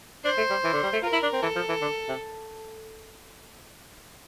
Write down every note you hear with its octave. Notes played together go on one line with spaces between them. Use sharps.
D4 C5
A3
G3
E3
D3
G3
A3
F4 A#4
E4
D4
C4
E3 A4
F3
E3
D3
C3